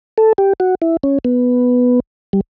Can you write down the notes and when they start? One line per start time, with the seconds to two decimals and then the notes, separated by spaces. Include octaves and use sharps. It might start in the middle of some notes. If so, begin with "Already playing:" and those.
0.18 A4
0.38 G4
0.60 F#4
0.82 E4
1.03 C#4
1.25 B3
2.33 G3